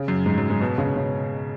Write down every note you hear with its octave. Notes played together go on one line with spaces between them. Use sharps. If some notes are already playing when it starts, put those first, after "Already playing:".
Already playing: C#3
F#2
G#2
F#2
G#2
B2
C#3
C#3